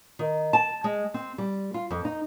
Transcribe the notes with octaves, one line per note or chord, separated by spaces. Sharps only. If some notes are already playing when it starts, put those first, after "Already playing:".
D#3
A5
G#3
C4
G3
F4
F2
D#4